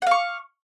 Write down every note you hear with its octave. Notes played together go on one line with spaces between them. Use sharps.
F5 F#5 C#6